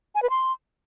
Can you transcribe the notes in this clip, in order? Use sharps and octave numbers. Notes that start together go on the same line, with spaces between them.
G#5
B4
C6